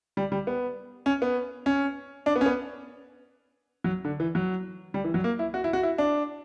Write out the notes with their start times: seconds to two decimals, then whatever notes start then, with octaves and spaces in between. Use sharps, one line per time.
0.17 G3
0.32 G3
0.47 B3
1.06 C#4
1.22 B3
1.66 C#4
2.26 D4
2.36 B3
2.41 C#4
2.46 B3
3.84 F#3
4.05 D3
4.20 E3
4.35 F#3
4.94 G3
5.04 E3
5.14 F#3
5.24 A#3
5.39 E4
5.54 F#4
5.64 E4
5.73 F#4
5.83 E4
5.98 D4